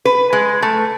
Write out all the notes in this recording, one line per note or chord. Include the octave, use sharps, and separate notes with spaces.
B4
G#3
A3